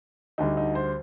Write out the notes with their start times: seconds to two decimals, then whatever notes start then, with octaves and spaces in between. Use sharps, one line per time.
0.38 D2 D3 G3 D#4
0.57 D#4
0.75 C5